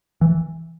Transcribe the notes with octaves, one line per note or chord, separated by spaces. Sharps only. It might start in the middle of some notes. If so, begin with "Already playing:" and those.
E3